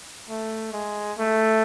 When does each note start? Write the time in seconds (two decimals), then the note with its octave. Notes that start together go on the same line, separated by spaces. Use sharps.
0.29 A3
0.73 G#3
1.18 A3